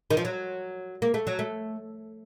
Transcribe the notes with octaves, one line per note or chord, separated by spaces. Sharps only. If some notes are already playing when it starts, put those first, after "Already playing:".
D#3
F3
F#3
A#3
A3
F#3
A3